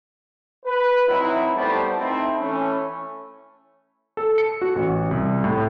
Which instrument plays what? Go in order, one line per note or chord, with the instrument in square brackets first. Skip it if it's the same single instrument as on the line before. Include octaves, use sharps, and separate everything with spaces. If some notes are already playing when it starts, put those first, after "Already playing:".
[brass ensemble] B4
F#3 C4 D#4 E4
G3 A3 B3 C5 A5
A3 C4 D#4 E4
E3 A3 C#4
[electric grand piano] A4
C#7
F#4
A1
C2
A2